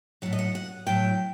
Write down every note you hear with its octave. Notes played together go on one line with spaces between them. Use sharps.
A2 F#3 F#5
D#5
F#5
F#5
A2 F#3 G5